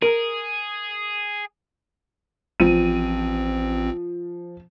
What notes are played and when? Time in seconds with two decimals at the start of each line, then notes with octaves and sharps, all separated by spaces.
0.02 G#4 A#4
2.60 A1 F3 C4 D#7